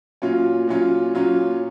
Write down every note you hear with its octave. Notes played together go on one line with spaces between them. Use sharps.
A#2 F#3 C#4 F4
A#2 F#3 C#4 F4
A#2 F#3 C#4 F4